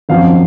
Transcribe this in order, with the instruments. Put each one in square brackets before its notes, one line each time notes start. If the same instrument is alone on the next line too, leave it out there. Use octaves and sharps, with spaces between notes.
[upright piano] G#1 F#2 F3 F5